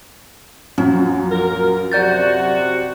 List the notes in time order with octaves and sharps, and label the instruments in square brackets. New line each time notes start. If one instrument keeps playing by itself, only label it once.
[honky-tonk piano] A#1 F#2 F#3 [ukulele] C#4
[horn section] A#4
[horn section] C3 F#4 [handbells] D5 G6 A6